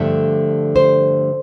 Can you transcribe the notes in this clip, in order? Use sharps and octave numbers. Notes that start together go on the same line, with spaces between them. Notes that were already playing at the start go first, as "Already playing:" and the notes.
Already playing: G2 D3 F3 A3 E5
C5